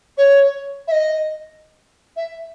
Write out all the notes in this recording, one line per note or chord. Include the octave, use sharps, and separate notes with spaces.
C#5
E5
D#5
E5